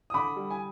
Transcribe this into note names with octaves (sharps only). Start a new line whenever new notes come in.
D#6
D3 B5 D6
G3
G#5